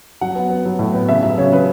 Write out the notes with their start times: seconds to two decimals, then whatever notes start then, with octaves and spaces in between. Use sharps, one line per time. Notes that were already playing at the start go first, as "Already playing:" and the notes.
0.21 F#3 F#5
0.35 B3
0.50 B3
0.65 F#3
0.79 A2
0.94 B3
1.09 C#3 E5
1.23 F#3 E5
1.38 C#3 C#5
1.52 C#3 B4